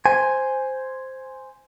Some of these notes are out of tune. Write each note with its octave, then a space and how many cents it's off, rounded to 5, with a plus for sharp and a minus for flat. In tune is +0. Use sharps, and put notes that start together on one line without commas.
C5 +0 G#5 +0